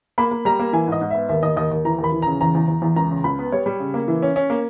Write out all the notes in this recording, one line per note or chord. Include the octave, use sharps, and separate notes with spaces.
A#3 B5
A#3
G3 A#5
A#3
E3 G#5
G#2 D#5
G#2
B3 E5
D#2 E5
D#2 D#5
D#2 D#5
D#2
E3 A#5
D#2
B5
E3
C#3 A#5
E2 A#5
E2
E2
E2
C#2 A#5
C#3
C#2 B5
B3
G3 C#5
G3
C#3
A#3
E3
C#4
C#4
A#3